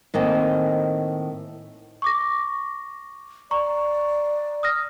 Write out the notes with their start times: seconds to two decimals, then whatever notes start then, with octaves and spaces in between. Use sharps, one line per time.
0.14 A2 D#3 A#3 C4 D#5 G#5
2.02 C#6 D6 A#6
3.51 D5 A#5 C#6
4.63 D#6 F6 A#6